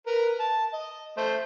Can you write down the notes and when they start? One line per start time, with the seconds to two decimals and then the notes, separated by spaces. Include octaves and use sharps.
0.07 A#4 B4
0.40 A5
0.73 D#5
1.17 A3 C5